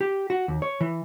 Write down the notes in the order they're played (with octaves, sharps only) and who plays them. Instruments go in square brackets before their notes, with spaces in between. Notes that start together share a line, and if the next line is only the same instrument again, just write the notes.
[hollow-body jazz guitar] G4
F#4
D#2
C#5
E3